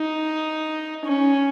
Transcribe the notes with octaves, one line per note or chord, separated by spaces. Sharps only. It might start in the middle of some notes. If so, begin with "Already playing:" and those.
Already playing: D#4
C#4